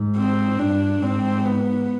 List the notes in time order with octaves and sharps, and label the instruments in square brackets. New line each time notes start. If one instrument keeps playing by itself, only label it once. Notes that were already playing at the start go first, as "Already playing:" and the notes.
Already playing: [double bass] G#2
[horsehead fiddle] C4
[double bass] G2 [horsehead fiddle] D4
[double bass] G#2 [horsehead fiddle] C4
[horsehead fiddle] B3